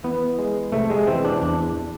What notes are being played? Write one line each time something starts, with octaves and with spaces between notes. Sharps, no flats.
E3 B3
G#3
C3 A3
G#3
E3 C4
D4
E2 D4